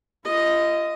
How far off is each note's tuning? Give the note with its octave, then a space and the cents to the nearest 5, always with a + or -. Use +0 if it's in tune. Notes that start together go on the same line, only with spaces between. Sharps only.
F4 -35 D#5 +0